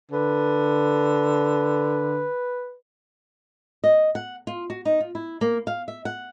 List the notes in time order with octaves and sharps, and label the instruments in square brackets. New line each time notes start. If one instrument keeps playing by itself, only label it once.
[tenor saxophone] D3 [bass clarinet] B4
[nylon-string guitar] D#5
F#5
F4
F#4
D#4
F4
E4
A#3
F5
E5
F#5